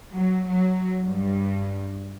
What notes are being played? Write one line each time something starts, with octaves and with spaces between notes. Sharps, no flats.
F#3
F#3
G2